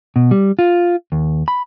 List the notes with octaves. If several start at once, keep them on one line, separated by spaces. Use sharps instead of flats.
B2
G3
F4
D#2
B5